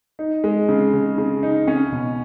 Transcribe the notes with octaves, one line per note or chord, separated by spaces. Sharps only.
D#4
G#3
C#3
C#3
C#3
D#4
C#4
B2